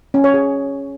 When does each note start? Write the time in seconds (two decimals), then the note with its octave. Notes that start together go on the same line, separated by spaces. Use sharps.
0.14 C#4
0.24 C#5
0.34 G#4